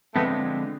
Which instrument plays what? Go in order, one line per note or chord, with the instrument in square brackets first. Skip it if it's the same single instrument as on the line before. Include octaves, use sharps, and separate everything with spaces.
[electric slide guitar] D3 F3 G#3 C4 [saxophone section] A3 B3